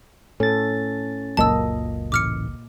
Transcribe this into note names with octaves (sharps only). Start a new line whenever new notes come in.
A2 C#4 A4 A6
F#1 C#2 A#2 F#3 A#3 D#5 A5 E6
A1 D6 F6 C#7